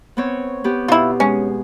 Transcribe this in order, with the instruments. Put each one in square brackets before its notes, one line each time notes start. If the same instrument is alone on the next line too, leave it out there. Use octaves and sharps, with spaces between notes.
[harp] B3 C4 C#5
B3 G4
[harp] B2 [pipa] E4 F4
[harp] G#3 [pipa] C#4